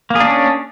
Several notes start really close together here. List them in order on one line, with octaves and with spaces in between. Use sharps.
A#3 G#4 D4 C#4